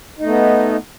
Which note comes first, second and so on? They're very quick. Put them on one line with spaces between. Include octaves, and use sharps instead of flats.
D#4 A3 B3